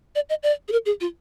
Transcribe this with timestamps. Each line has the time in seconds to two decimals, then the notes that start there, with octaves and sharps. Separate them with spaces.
0.15 D5
0.29 D#5
0.43 D5
0.68 G#4
0.72 A#4
0.86 G#4
1.01 F4